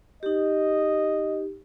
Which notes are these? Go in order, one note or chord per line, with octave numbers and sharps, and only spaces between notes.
D#4 G4 D#5